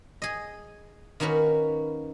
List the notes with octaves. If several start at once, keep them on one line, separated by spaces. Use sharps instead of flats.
G#4 D#5
D#3 A#3 C#4 F#4 B4